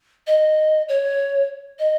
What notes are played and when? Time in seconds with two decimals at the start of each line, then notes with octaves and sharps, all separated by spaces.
0.27 D#5
0.89 C#5
1.79 D#5